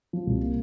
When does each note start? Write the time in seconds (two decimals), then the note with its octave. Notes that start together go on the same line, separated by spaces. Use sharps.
0.13 F3
0.27 C2
0.41 A#3